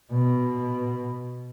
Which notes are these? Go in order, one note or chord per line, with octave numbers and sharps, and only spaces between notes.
B2